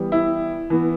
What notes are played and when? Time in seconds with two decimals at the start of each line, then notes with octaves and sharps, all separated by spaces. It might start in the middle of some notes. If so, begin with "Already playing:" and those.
Already playing: E3 G3 B3
0.12 E4
0.70 E3 B3